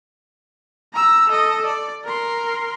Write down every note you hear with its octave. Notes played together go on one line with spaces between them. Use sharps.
A#5 E6
A4 D#5
D5
A#4 C6